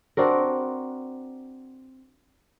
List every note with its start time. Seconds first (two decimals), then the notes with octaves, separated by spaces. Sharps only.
0.17 C4 D4 F#4 A#4